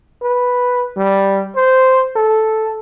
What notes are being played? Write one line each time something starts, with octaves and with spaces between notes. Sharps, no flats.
B4
G3
C5
A4